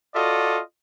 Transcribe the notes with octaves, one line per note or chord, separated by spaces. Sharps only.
F4 F#4 A4 D5 D#5